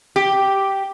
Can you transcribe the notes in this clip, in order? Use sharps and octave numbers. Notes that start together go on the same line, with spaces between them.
G4